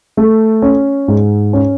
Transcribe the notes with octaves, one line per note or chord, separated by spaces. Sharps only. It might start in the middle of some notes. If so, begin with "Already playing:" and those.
A3
C#4
G#2
C#4